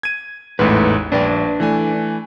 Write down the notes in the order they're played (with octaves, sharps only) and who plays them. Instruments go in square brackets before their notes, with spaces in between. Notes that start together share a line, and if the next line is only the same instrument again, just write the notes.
[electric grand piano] G#6 D#7
[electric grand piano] A1 E2 G#2 [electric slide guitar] A3 B4
[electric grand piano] A#1 [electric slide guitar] D4 B4 D5
[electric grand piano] E3 A3 G#5